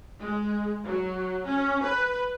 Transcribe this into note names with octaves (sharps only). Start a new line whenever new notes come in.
G#3
F#3
C#4
B4